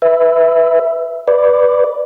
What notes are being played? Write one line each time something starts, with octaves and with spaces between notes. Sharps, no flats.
B4 E5
B4 D5